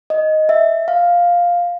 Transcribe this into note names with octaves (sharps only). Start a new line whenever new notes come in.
D#5
E5
F5